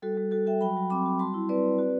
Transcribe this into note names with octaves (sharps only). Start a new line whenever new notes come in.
G3 F#4 A4
G3
G3 F#4 A4
F#4 E5 G5
F#3 G5 B5
F#3
C4 B5 D6
F#4
G3 A5 C6
E4
C4 B4 D5
C4
F#4